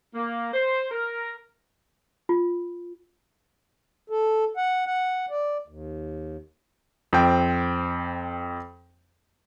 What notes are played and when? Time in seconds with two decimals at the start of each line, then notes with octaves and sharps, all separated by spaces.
0.15 A#3
0.54 C5
0.91 A#4
2.29 F4
4.10 A4
4.57 F#5
4.86 F#5
5.30 D5
5.68 D#2
7.13 F2 C4 G5